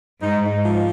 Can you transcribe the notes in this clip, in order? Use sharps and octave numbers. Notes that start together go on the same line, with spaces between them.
G#2 D#4
D#4
F3